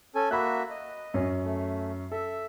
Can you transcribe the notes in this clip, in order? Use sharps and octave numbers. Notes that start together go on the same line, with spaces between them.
C#4 A4 G#5
A#3 F#4 E5 B5 F#6
D#5
F#2 C#4
A3
A4 E5